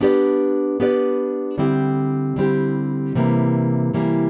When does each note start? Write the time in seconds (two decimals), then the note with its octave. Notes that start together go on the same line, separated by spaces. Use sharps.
0.01 B3 D4 G4 B4 D5
0.80 B3 D4 G4 B4 D5
1.58 D3 G3 C4 E4 G4
2.36 D3 G3 C4 E4 G4
3.15 C3 E3 G3 A#3
3.93 C3 E3 G3 A#3